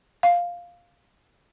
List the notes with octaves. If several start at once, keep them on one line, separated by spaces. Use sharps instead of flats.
F5